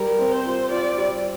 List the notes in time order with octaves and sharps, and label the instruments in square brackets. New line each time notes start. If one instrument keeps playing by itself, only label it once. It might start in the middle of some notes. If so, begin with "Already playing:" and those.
Already playing: [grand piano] G3 [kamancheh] A#4
[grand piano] C4
[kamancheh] C5
[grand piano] F4
[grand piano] F4 [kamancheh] D5
[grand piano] G3